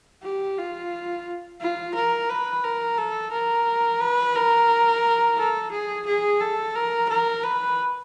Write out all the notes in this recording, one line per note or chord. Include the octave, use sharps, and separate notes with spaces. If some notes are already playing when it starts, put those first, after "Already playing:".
G4
F4
F4
A#4
B4
A#4
A4
A#4
B4
A#4
A4
G#4
G#4
A4
A#4
A#4
B4